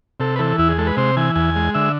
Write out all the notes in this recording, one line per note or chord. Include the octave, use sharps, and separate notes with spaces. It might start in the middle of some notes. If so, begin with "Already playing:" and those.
C3 A4
B4
E3 A4
E2 E4
G#4
G#3 A4
B4
C3 C5
E3 G#5
E2 G#5
G#3
D3 E5